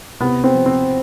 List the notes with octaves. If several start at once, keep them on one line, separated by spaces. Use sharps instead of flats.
C3 B3
C4
F3
C4